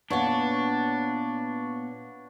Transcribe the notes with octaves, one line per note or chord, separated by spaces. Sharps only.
A#2 B3 D4 B4 C#5 F#5